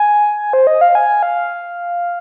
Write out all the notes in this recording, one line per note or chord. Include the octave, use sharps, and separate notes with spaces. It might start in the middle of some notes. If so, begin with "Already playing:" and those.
Already playing: G#5
C5
D#5
F5
G#5
F5